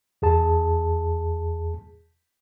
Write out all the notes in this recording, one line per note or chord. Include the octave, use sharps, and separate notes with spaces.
E2 G#4 A5